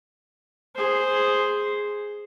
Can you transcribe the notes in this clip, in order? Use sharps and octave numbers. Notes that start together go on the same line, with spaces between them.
G#4 C5